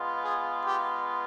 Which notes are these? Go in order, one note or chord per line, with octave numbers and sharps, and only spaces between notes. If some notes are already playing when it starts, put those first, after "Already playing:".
Already playing: G#3 B3 F4
G#4
G4